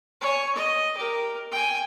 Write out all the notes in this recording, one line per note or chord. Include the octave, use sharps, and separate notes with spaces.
C#5 G#5
D#5
G4 A#4
G5 G#5